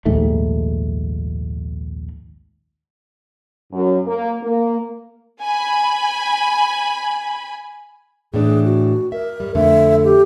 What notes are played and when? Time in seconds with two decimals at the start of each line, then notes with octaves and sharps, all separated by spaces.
0.05 A#1 D#2 G#2 A3
3.73 F#2
4.07 A#3
4.42 A#3
5.42 G#5 B5
8.34 A2 E3 D4 G#4
8.64 F#4
9.12 A#4 E5
9.40 G2 G3
9.55 F2 D3 A3 E5
10.04 G4